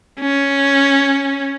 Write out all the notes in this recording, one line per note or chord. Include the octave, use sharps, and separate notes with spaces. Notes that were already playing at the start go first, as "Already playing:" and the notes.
C#4